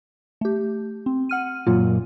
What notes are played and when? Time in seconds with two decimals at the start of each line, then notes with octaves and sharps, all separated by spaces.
0.41 A3 G4
1.06 C4
1.29 F#5 F6 D#7
1.67 F#2 A#2 F4